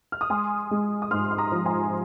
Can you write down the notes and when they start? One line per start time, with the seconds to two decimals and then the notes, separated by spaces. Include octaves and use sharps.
0.12 F6
0.21 D#6
0.30 G#3 G#5 C6
0.71 G#3
1.02 D#6
1.11 G#2 C6 F6
1.31 C6
1.38 A#5 D#6
1.52 F3
1.66 G#5 C6